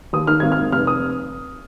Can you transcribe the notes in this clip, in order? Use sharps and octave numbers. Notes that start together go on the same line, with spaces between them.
D#2 D#6
D#3 F6
G#1 G#6
F6
G#2
F1 F6
D#6